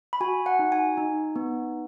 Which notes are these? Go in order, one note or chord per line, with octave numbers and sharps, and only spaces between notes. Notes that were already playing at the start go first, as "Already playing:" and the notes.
B5
F#4 G#5
F#5
D#4
G#5
D#4
B3